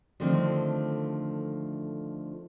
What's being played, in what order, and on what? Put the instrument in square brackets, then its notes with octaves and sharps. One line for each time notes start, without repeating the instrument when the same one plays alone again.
[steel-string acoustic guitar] D3 D#3 F3 A3 C4